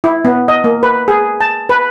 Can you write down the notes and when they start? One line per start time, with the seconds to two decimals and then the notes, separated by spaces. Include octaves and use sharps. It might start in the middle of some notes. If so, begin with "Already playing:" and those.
0.04 E4
0.25 B3
0.48 D#5
0.64 A#3
0.83 B4
1.08 G#4
1.41 A5
1.69 B4